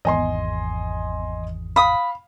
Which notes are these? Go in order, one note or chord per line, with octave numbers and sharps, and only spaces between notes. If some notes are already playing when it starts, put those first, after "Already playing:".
G#1 E2 D#5 G#5 C6
F5 B5 D#6